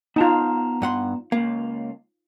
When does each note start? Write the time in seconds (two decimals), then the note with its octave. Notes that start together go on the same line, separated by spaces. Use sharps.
0.16 B3 D#4 F4 A5 A#5
0.82 G2 F#5 C6
1.32 C#2 A#3 F5